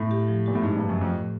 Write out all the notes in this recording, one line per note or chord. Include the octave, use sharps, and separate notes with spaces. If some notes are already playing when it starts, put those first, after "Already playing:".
Already playing: A2
G4
F3
A#2 G4
A2
G#2 A3
G2 F3
F#2
F2 A3
A2